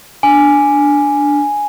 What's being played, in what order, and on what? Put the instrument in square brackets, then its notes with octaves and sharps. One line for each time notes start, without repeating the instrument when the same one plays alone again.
[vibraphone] D4 [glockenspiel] G#5